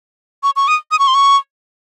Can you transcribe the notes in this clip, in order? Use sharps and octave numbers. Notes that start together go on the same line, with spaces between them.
C#6
C#6
D#6
D#6
C#6
C6
C#6